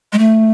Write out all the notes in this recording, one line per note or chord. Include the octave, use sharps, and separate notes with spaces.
G#3
A3